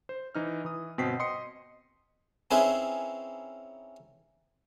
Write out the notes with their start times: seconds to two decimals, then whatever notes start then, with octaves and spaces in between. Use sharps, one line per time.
0.09 C5
0.35 E3 D#4 F6
0.65 E3 D#6
0.98 G1 B2 C4 G5 B6 C7
1.19 D#5 C6 D#6 C7 C#7
2.51 C4 C#4 D#4 E4 G#4 B4